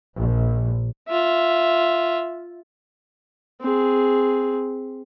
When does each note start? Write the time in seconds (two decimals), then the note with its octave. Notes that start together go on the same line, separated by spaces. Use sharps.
0.17 A#1
1.08 F4 E5
3.61 C4 G#4